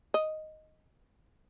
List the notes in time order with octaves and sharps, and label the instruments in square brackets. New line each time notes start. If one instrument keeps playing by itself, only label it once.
[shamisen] D#5